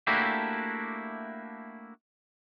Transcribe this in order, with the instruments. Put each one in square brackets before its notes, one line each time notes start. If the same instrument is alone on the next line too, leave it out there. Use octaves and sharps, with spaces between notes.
[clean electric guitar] A3 A#3 D4 E4 F#4 G4